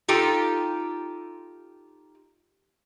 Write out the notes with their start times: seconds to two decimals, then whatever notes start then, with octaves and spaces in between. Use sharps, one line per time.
0.08 D#4 F4 G4 A4